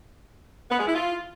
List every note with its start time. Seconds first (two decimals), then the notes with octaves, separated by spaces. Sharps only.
0.70 B3
0.78 G#3
0.86 E4
0.95 F4